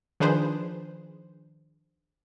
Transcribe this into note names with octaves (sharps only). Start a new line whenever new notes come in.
D#3 F3 D4 G#4 B4 C5